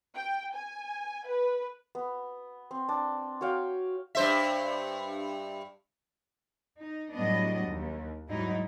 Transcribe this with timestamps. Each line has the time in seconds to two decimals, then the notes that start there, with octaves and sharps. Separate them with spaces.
0.15 G5
0.54 G#5
1.26 B4
1.95 B3
2.71 C4
2.89 D4
3.41 F#4 C#5 F5 G5
4.15 G2 C5 E5
6.80 D#4
7.13 A2 F#3 G3 B3 D4 D#5
7.68 D#2
8.29 G#2 F#3 G3 D#4 E4